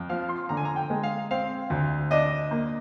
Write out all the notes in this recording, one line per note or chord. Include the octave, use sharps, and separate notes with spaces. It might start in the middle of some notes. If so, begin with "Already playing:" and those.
Already playing: F2
F3 F5
C6
D3 A#5
G#5
A#5
G5
G#3
F5
C4 F5
D2
D4 D#5
A#3